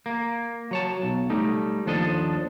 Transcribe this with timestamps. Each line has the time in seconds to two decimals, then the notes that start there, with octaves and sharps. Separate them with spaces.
0.06 A#3
0.71 F#3 C#5 A5
1.03 B1
1.30 G3 A3 D#4
1.86 D#2 F3 D4 A4 D#5